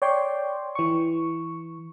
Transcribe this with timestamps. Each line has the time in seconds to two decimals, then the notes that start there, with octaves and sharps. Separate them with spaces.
0.02 C#5 D5 G5 C6
0.75 E3 C#6